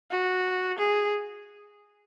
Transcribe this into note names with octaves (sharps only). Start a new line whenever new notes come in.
F#4
G#4